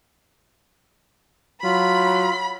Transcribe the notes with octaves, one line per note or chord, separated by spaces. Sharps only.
F#3 F4 B5